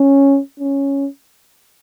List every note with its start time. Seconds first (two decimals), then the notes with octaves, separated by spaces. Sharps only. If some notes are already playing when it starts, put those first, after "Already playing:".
Already playing: C#4
0.60 C#4